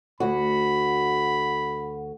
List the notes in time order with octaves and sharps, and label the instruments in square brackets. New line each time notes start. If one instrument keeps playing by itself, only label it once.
[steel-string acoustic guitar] D2 F#4 [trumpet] B5